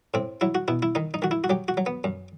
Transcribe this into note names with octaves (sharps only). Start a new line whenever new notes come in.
A2 C4
F#3 E4
F#4
B2 E4
E4
D#3 D#4
D#4
D#3 F#4
E4
F#4
F#3 G4
F#4
F#3
B3
F#2